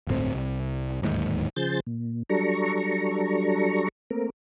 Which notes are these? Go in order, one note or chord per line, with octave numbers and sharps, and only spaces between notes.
D1 G1 A2 C4
C2
D1 D#2 G#2
C#3 F3 G#4 C5 G6 A6
A#2
F#3 G3 D4 A4 A#5 C#6
A3 A#3 C4 A#4